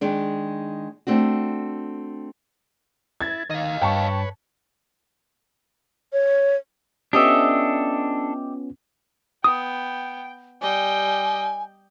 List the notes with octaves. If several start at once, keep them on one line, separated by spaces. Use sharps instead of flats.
D#3 G#3 D4
A3 C4 D4 F#4
E4 G#6 A6
D#3 D#5 F5
G2 B4 C#5 G5 A5 C#6
C#5
B3 C#4 D4 F4 G4 A4 D#5 E5
B3 G5 D#6
G3 D#5 G5 G#5